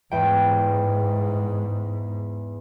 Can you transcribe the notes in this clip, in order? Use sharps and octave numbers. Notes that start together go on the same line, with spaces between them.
E2 G#2 G5